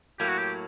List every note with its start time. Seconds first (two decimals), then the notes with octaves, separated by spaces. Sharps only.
0.20 A2 F#3 A#3 G4
0.29 F#4
0.39 G4